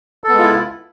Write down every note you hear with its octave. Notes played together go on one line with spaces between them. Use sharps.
G#3 B3 E4 F4 A4